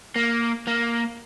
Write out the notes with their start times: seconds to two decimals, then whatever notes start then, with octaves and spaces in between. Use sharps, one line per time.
0.16 A#3
0.67 A#3